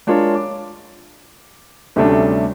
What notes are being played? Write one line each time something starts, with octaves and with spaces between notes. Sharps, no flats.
G#3 D4 F4 A#4 C#5
D6
D2 C3 G3 A3 C#4 D4